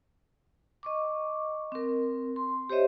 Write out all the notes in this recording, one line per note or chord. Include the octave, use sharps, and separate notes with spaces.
D#5 C#6 D6
C4 A#4
C6
G4 C5 C#5 D#5 E5